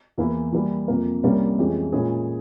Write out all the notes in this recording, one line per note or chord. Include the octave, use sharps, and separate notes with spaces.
E2 E3 A#3 E4
E3 G3 A#3 E4
F2 C3 F3 A#3
C2 C3 G3 A#3 C#4
F2 E3 G#3 C#4 G4
A#2 G#3 C#4 E4 G#4